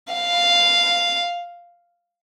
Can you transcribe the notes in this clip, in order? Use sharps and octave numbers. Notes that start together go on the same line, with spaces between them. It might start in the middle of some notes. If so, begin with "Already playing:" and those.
F5